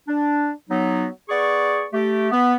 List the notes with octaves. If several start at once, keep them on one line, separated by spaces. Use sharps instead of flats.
D4
F#3 B3 D#4
B3 G#4 D5 C#6
A3 G4
B3